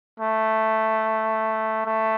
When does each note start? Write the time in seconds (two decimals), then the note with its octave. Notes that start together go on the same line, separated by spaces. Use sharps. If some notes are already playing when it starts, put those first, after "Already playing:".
0.20 A3
1.86 A3